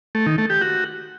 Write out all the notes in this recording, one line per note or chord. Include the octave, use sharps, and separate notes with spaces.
A3
D#3
A3
G4
F#4